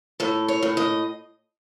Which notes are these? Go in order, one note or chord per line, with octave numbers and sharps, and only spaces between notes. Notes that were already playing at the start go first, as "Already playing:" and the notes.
A2 A4
C#5
A2
D#5